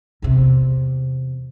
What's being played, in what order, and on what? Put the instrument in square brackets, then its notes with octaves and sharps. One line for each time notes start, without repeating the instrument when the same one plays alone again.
[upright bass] E2 C3